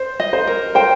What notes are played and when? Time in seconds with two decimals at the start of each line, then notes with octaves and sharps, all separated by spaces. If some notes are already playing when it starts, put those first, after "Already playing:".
Already playing: C5
0.20 D#5
0.33 C5
0.47 A#4
0.75 C5 G5